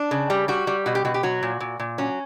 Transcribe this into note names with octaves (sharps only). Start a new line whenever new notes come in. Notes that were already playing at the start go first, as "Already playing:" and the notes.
Already playing: D4
C#3
G3
G3 F#4
G3
B2 F#4
G4
B2 F#4
G4
F#3 F#4
A#2
A#2
A#2
F#3 C#4